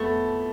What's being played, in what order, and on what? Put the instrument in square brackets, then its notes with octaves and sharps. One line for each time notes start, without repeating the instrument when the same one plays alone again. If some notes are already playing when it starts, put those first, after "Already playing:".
Already playing: [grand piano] F2 B3 [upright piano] A3